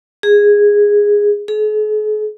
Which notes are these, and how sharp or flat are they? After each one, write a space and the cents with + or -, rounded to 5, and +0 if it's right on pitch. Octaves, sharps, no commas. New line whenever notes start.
G#4 -10
G#4 +45